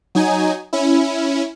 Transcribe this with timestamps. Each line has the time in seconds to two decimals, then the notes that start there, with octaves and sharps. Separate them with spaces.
0.15 F#3 D#4 G#5
0.73 C#4 E4